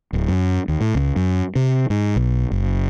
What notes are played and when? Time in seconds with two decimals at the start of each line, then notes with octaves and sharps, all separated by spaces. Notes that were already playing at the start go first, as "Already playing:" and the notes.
0.13 D1
0.28 F#2
0.68 D#2
0.81 A2
0.95 C#2
1.16 F#2
1.56 C3
1.90 G#2
2.16 B1
2.51 F#1